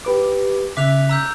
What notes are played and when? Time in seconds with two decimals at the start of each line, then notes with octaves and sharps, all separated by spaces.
0.05 G4 B4 D6
0.77 C#3 E5 D6 F#6 B6 F7
1.09 A#5 E6 G6